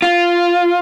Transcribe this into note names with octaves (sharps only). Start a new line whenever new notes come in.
F4